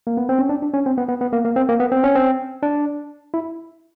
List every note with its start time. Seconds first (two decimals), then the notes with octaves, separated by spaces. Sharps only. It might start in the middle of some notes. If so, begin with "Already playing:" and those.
0.07 A#3
0.17 B3
0.29 C4
0.39 C#4
0.49 D4
0.62 D4
0.74 C#4
0.86 C4
0.98 B3
1.09 B3
1.21 B3
1.33 A#3
1.45 A#3
1.56 C4
1.69 A#3
1.80 B3
1.92 C4
2.04 C#4
2.15 C4
2.63 D4
3.34 E4